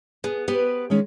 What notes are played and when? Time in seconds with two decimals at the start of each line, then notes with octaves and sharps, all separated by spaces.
0.24 B3 G#4
0.48 B3 G4 B4 C5
0.90 D#3 G#3 C#4